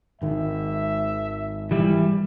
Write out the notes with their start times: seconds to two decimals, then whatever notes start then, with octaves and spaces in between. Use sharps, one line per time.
0.22 G#1 D#3 E5
1.71 E3 G3 E4